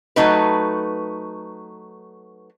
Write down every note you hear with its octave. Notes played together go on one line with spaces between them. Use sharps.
F#3 A3 D#4 B4